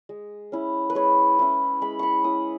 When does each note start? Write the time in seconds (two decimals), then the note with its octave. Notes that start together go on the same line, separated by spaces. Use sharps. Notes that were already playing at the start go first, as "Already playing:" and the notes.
0.09 G#3
0.52 C#4 E4
0.90 B4
0.95 G#3 C#5
1.39 C#4 E4
1.82 G#3 B5
1.99 B5 C#6
2.24 C#4 E4 D#6